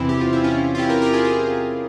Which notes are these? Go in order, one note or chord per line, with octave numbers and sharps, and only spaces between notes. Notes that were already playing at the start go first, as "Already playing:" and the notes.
Already playing: E2 C3 E3 C4 E4
G4
F4
E4
C#4 F4
F4
E4 G4
G4 A#4
G4 A#4
F4 G#4
F4 G#4